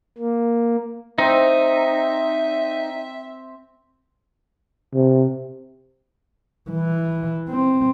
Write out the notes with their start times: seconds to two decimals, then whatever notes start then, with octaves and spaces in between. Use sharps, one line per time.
0.18 A#3
1.18 C4 D#4 E5
4.94 C3
6.71 E3
7.49 C4